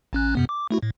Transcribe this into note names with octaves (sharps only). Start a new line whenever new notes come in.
A1 C#4 F#6
F#2 C3 B3
D6
A3 E4 F#4
A2